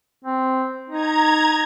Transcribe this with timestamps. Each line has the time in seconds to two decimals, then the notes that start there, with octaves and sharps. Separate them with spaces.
0.25 C4
0.90 D#4 A#5 G#6